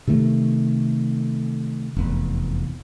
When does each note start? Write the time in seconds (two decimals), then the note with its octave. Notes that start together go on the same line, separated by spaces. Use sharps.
0.07 C3 D#3 A3
1.97 F1 E2